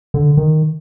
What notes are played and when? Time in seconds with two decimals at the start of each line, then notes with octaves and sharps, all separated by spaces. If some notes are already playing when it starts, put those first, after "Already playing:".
0.14 D3
0.37 D#3